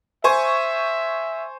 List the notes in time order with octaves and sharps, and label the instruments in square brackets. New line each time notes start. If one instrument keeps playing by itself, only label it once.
[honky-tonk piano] C5 G#5 C#6 [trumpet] E5